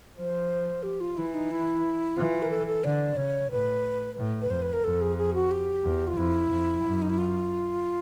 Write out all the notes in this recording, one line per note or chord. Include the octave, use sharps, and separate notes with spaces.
F3 C5
G4
F4
E3 E4
D#4
E4
E3 F4
A#4
A4
A4
D3 D5
C#3 C#5
A2 B4
A2
B4
F2 C5
B4
A#4
F2 A4
G#4
G#4
F#4
G4
E2
F4
F2 E4
F2
F#2
D#4
E4
F4